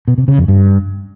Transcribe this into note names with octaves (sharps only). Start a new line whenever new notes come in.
B2
C3
C#3
F2
G2